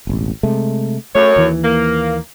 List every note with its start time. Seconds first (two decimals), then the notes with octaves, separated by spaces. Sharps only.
0.07 E1 A1
0.43 C3 G#3 A3
1.15 F#2 A3 C#5
1.36 D#2 E3
1.64 A#3